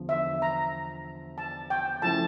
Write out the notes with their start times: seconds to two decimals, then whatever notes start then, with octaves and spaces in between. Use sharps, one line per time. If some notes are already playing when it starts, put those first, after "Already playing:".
Already playing: E2 D3 F3
0.09 E5
0.42 A#5
1.38 A5
1.70 G5
2.02 C#3 F3 A3 E4 A5